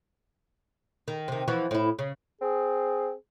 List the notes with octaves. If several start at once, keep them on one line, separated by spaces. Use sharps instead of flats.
D#3
C3 D#3
E3 F3 F#4
A2 E4
C#3
C4 G#4